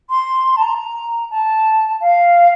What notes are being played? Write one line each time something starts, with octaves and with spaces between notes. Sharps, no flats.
C6
A5
A#5
A5
F5